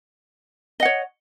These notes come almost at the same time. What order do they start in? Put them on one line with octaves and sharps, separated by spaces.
D#5 F#5 C#5